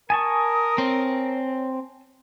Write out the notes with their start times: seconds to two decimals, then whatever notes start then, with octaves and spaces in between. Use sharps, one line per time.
0.10 A#4 G#5 A5 C#6 D#6
0.78 C4 C#5